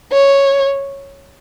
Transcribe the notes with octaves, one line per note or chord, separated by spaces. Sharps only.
C#5